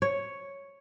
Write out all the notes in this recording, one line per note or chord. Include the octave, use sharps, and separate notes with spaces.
C#5